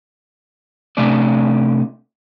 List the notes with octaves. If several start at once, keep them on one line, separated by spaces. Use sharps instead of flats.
C3 A3 C#4 D4 D5